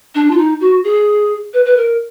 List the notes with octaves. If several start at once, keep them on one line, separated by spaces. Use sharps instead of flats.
D4
F4
D#4
F#4
G#4
B4
B4
A#4